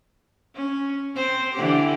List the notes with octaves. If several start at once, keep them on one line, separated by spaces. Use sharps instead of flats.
C#4
C4 C5
D3 E3 G4